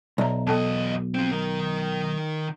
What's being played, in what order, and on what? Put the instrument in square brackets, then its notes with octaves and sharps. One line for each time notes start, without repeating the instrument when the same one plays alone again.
[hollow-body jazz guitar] B1 [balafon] D5 E5 A#5
[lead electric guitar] E2 D#5 [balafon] B3 A4 A5
[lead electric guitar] F3 C4
D#3 A#4